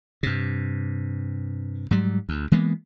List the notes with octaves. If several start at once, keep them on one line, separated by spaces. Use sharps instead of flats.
G2 C3
G#2 F#3 G3
D2
E3 G#3 A#3 B3